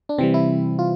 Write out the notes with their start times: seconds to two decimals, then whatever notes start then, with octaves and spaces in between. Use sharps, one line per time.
0.09 D4
0.18 C3 E3 G3 C4
0.34 E4
0.79 F4